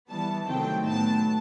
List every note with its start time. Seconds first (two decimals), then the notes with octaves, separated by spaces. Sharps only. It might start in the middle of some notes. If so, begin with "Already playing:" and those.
0.10 E3 G3 B3 A5
0.48 C3 D#3 F#3 A3 C4 G5
0.86 A2 F#3 B3 A5